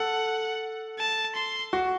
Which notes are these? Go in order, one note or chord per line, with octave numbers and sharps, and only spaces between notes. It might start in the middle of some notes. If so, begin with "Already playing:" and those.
Already playing: A4 F#5
A5
C6
F#4